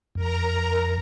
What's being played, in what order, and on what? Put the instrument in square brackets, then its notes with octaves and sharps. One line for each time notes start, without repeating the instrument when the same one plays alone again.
[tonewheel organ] F2 [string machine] A#4 A#5